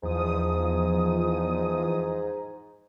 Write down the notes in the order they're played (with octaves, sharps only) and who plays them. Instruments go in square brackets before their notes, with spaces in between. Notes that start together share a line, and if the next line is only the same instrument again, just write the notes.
[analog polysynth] E2 F3 D#6 [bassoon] G#2